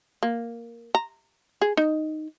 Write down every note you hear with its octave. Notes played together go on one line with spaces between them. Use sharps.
A#3
A#5
G#4
D#4